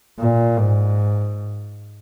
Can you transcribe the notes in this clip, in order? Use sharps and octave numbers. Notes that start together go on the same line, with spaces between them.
A#2
G#2